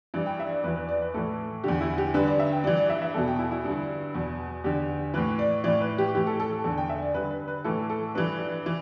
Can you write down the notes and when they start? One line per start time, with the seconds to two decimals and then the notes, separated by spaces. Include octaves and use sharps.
0.14 G2 E3 D5
0.26 G5
0.40 E5
0.51 D5
0.64 E2 B4
0.67 E3
0.76 B4
0.89 D5
1.02 B4
1.14 A2 E3 A4
1.64 E2 D3 G4
1.81 E4
1.98 G4
2.14 G2 D3 B4
2.27 D5
2.40 E5
2.52 G5
2.64 G2 E3 D5
2.77 D5
2.90 E5
3.02 E5
3.14 E2 B2 A4
3.27 G5
3.39 E4
3.51 E4
3.65 G2 D3
4.15 E2 B2
4.64 E2 D3 G4
5.14 A2 E3 B4
5.39 D5
5.64 A2 E3 D5
5.81 B4
5.98 G4
6.15 A2 E3 G4
6.27 A4
6.40 A4
6.51 A4
6.64 E2 D3 A4
6.78 G5
6.89 E5
7.02 D5
7.14 G2 D3 B4
7.31 B4
7.48 B4
7.64 A2 E3 A4
7.90 A4
8.15 G2 E3 B4
8.66 E3